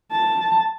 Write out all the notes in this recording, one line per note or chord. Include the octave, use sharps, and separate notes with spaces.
A5